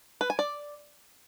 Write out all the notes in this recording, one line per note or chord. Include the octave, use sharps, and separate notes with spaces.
B4
G#5
D5